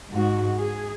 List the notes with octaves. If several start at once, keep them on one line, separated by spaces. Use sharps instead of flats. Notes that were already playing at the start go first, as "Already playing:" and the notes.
G#2 F#4
G#4